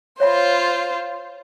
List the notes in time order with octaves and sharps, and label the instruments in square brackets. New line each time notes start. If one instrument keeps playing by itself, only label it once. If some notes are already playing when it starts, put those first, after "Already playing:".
[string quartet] F4 C5 [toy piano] C#5 E5 B5